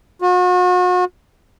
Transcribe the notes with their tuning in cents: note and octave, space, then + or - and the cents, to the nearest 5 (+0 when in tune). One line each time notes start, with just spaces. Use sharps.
F#4 -40